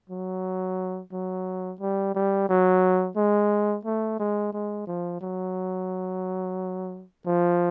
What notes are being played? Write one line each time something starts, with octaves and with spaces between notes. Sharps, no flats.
F#3
F#3
G3
G3
F#3
G#3
A3
G#3
G#3
F3
F#3
F3